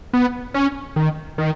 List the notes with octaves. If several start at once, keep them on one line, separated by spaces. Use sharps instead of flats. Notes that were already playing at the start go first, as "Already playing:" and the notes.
B3
C#4
D#3
D#3